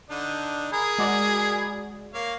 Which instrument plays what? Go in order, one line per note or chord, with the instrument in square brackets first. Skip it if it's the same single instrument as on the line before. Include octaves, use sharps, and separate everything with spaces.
[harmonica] D3 D4 D#4
[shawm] G#4 [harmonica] A#4 B5
[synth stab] G#3 F#4 D5
[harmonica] A#3 C#5 F5